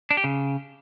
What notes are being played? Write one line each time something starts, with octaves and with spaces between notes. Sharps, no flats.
D4
G4
C#3